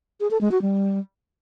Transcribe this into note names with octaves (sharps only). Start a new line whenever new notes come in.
G#4
A4
G#3
F#4
G3